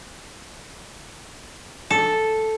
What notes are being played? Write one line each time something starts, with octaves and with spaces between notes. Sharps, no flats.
A4